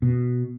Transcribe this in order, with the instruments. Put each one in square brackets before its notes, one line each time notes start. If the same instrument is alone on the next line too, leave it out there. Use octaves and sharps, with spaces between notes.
[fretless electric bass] B2